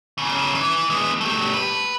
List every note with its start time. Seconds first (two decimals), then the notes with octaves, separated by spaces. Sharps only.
0.18 E2 C#3
0.55 E3
0.90 G#3 B3
1.21 A3 G4
1.54 B4